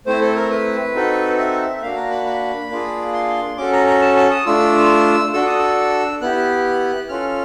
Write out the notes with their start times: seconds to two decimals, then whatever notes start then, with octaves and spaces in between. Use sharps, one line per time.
0.06 A3 C4 E4 C5
0.21 A4
0.36 A#4
0.50 B4
0.94 C4 D#4 F#4 A4
1.38 E5
1.77 E5
1.82 A#3 D4 F#4 F5
1.96 A#5
2.11 B5
2.26 B5
2.70 A#3 D4 F4 G#4
3.14 C6
3.57 C#4 F#4 A4 D6
3.73 A#5
3.87 A#5
4.02 A5
4.16 A5
4.31 D#6
4.46 A3 D4 F4 E6
5.33 D4 F#4 A4 E6
5.46 D#6
5.59 E6
6.21 B3 E4 G4 F#6
7.09 C#4 F4 A4 F6